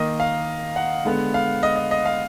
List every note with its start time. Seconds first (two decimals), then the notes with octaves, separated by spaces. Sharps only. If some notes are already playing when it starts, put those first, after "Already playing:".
Already playing: D#3 A#3 D#5
0.20 F5
0.76 F#5
1.05 D3 G#3 B3
1.34 F5
1.63 D#5
1.76 D#5
1.91 D#5
2.06 F5